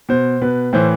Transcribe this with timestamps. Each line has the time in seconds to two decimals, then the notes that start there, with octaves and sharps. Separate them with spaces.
0.09 B2 C5
0.41 B2 B4
0.73 A2 E3 C5